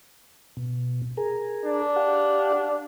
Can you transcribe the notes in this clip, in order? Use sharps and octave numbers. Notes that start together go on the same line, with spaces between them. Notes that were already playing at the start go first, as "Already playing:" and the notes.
B2
G#4 A#4
D4
G4 F5 F#5